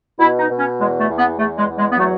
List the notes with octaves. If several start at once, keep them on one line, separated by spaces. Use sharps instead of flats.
B2 E4
D#4
B2
C#4
E2 G#3
A3
E2
B3
E2 A3
G#3
E2
G#3
B3
F#3 A3